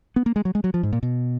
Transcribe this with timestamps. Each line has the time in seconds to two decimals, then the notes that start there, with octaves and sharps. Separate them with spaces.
0.16 B3
0.26 A#3
0.36 G#3
0.45 F#3
0.55 G#3
0.64 F#3
0.74 F3
0.83 G#2
0.92 A#2
1.03 B2